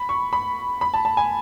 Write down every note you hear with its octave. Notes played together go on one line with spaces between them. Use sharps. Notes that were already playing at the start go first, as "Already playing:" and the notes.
Already playing: B5
C#6
B5
B5
A5
A5
G#5